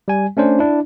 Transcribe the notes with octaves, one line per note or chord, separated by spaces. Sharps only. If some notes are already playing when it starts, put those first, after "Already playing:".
G3 G#5
A3 C#4 D4 C5
D4 E4